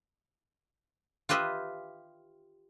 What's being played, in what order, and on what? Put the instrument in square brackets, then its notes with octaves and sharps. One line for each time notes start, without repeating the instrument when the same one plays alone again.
[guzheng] F4 G4 B4 D#5 E5